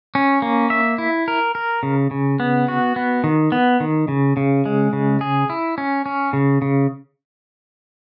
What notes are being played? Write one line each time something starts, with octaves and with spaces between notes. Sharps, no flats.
C#4
A#3
E5
E4
A#4
A#4
C#3
C#3
B3
F#4
B3
D#3
B3
D#3
C#3
C#3
G#3
C#3
G#4
E4
C#4
C#4
C#3
C#3